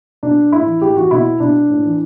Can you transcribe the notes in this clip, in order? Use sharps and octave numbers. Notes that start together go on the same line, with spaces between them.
B2 D4
A2 E4
E3
A2 G4
E3 F#4
B2 E4
B2 D4
A2
E3